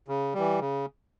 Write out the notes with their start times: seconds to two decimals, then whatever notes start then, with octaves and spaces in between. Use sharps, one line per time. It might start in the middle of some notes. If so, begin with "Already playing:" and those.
0.08 C#3
0.34 E3 G3
0.60 C#3